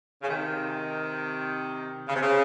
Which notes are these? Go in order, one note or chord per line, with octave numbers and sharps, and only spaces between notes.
C#3
C3 D#3
C#3
C3
C#3